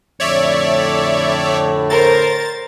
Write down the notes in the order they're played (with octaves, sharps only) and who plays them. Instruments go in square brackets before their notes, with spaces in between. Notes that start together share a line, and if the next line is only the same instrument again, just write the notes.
[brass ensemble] F2 A2 D3 [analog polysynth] C#5 D5 E5
[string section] A#4 C5 [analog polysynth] A6